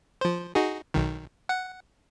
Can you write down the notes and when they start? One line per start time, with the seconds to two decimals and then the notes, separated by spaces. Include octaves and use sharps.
0.21 F3 C5
0.55 D#4 F#4 G#4
0.94 B1 D#3
1.49 F#5